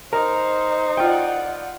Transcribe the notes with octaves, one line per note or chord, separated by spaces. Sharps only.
D#4 A#4 C5
F4 D5 F#5 G5